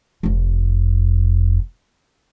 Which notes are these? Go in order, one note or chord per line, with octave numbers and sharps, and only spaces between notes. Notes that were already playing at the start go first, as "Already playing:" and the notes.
F1 F2